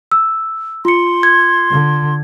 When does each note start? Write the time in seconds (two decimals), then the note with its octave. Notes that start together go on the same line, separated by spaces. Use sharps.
0.12 E6
0.85 F4 C6 C#7
1.23 G#6
1.71 D3